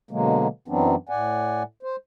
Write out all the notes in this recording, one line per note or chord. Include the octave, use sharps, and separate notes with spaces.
B2 D3 F#3 G#3 A#3
F#2 E3 F#3 B3 C4 D4
A2 D5 F#5 G#5
C5